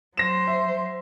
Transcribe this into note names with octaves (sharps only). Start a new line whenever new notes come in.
F#3 C5 A#6 E7
E5